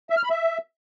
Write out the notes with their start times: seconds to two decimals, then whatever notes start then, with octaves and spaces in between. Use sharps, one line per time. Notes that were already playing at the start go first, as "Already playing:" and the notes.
0.10 E5
0.17 F6
0.23 B5
0.30 E5